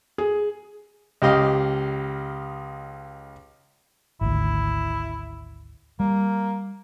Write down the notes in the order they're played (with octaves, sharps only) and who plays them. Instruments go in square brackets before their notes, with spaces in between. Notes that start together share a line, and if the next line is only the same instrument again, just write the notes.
[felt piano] G#4
[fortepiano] C#2 G4 D#5 F5
[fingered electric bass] G#1 D2 [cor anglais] E4
[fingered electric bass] G3 [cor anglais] A#3